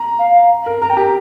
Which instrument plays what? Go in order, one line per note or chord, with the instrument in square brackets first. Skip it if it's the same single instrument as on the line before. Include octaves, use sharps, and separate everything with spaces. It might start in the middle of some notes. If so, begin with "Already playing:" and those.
Already playing: [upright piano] A#5
[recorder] F5
[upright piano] A#4
[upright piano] A#4 [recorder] A#5
[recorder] G5
[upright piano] G4 [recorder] A#5